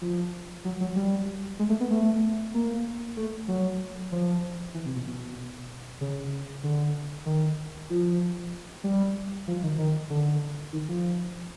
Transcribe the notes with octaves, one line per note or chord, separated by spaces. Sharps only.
F3
F#3
F#3
G3
G#3
A3
B3
A3
A#3
A3
F#3
F3
E3
C3
B2
B2
C#3
D3
D#3
F3
G3
F3
D#3
D#3
D3
D#3
F3